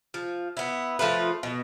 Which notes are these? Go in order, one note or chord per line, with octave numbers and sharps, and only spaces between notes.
F3
B3 E4
F3 A3 F4 B4
B2